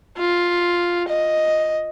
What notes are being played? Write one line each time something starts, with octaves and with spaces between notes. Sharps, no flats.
F4
D#5